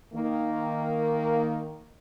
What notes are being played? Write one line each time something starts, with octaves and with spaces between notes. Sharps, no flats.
D#3 A#3